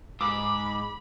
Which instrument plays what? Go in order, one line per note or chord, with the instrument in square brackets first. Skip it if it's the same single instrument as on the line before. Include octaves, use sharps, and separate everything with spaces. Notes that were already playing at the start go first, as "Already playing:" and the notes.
[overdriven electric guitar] G#2 [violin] B5 [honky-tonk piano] D6